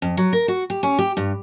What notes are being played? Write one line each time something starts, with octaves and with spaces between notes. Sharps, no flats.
F2
F#3
A#4
F#4
G4
C#4
G4
G2